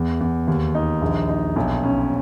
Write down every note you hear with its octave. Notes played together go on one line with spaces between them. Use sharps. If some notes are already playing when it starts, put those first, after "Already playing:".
Already playing: E2
E2
D#2
D#4
A#1
D#4
B1
C#4